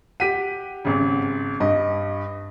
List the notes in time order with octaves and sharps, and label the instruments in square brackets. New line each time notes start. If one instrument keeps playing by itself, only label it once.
[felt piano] G4 F#5 [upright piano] B6 D#7
[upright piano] G#1 C#3
[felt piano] G2 [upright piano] D#5